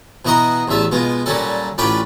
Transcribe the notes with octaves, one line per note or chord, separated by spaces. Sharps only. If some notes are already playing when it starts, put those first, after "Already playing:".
B2 E3 F#4 D#5 A#5 C6
A1 E2 D3 E5 A5
B2 G#3 F4
A#2 F#3 G3 C#4 A4
A1 C#4 F4 B4 D5 G5